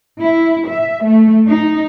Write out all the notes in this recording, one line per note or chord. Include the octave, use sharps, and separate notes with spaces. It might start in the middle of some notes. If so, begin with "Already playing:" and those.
E4
E5
A3
D#4